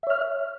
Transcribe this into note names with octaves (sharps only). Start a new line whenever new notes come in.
C#5 E5 F6